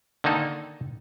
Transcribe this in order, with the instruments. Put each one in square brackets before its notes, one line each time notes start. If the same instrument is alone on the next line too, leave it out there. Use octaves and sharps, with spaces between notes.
[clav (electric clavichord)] D3 D#3 A#3 D#4 A4